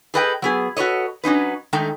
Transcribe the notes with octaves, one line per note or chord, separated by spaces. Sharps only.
G#4 A4 B4 D#5 F5 G5
F#3 B3 G#4
F#4 A4 B4 C#5 D#5
F#3 C#4 D#4 B4
D#3 G#3 A3 D#4 G5